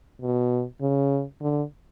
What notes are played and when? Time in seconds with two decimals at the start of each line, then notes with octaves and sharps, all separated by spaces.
0.21 B2
0.81 C#3
1.42 D3